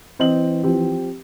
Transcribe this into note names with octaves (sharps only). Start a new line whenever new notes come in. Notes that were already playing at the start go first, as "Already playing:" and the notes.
E3 C4 D#5 F#7
F3 C4 G4